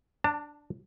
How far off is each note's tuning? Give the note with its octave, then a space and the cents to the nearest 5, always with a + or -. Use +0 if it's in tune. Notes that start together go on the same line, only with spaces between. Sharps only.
D4 +0 A5 +30